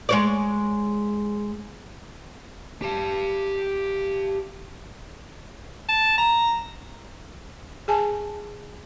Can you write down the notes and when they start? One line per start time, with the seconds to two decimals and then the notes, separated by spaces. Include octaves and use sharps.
0.09 G#3 C#5 D5
2.82 G4 A5
5.89 A5
6.18 A#5
7.88 G#4 G#5 A5